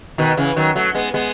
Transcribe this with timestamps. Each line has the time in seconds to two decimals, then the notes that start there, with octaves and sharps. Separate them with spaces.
0.18 B2 D#3
0.37 C#3 E3
0.56 D#3 F#3
0.76 F#3 A3
0.95 G#3 B3
1.14 G#3 B3